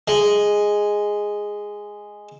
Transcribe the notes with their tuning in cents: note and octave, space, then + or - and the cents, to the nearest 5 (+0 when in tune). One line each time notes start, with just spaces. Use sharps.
G#3 -5